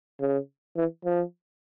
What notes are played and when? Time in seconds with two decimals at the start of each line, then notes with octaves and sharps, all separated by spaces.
0.20 C#3
0.76 E3
1.05 F3